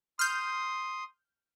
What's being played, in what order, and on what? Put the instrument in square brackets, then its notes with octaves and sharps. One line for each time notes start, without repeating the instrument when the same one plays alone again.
[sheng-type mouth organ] C6 D#6 [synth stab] F6 G6